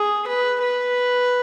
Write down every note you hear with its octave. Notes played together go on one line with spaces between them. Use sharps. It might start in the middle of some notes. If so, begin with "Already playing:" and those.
Already playing: G#4
B4
B4